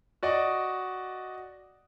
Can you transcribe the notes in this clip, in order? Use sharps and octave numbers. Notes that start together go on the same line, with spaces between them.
F#4 D5 D#5